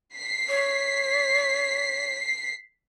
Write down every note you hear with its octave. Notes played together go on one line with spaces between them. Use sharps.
B6 C7
C#5